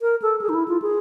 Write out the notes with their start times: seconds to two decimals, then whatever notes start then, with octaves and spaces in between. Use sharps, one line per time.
0.02 A#4
0.22 A4
0.41 G#4
0.49 D#4
0.54 E4
0.68 F4
0.82 G#4